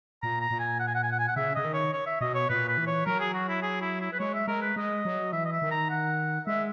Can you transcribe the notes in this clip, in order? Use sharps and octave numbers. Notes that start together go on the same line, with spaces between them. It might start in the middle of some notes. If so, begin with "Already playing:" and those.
A#2 A#5
A#5
A#2
G#5
F#5
G#5
F#5
G#5
F#5
G#5
F#5
C#3 E5
C#3 D#5
D#3
C#5
C#5
E5
B2 D#5
C#5
A#2 B4
B4
E3
C#5
F#3 A#4
G#4
F#4
E4
G#4
E4
E4
B4
G#3 C#5
E5
G#3 A#4
B4
G#3 D#5
F#3
E3 E5
D#5
E5
D#3
A#5
F#5
G#3 E5